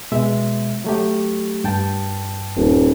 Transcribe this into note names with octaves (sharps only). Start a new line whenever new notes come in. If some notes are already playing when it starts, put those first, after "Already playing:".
B2 G#3 E5
F#3 A3 G4
G2 G5 A5
D#1